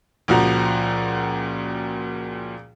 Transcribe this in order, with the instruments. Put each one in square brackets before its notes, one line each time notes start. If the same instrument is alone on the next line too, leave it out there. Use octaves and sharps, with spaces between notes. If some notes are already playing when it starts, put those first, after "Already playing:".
[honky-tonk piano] C#2 A#2 F3 F#4 A#5